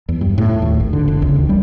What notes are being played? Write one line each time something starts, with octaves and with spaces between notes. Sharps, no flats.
E2
G2
A2
D#2
G#1
D3
F1
C#2
D#2
G3